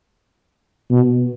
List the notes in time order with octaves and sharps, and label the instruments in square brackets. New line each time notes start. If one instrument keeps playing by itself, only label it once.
[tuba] B2